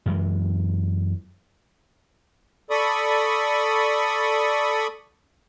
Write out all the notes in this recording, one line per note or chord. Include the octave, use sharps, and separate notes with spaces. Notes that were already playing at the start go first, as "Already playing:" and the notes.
F#2 E3 G#3
A4 D5 B5 C#6 D#6